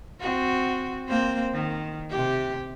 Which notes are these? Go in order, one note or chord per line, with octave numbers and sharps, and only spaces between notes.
C4 F#4
A#3 C4 C5
D#3
C3 G4